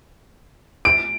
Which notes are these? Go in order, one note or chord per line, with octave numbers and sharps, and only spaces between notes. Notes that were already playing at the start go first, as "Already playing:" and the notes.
D7